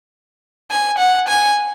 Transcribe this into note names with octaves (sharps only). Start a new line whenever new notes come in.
G#5
F#5
G#5